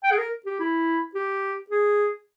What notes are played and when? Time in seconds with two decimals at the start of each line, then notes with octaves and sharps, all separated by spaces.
0.04 G5
0.11 G#4
0.18 A#4
0.46 G4
0.60 E4
1.15 G4
1.70 G#4